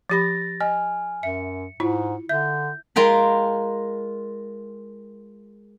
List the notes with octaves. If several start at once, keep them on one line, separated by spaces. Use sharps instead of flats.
F3 G4 B5 A6 A#6
D#5 G#5 F6
F#2 E5 C#7
G#2 E4 F4
D3 E5 G6
G#3 F4 A#4 G5 B5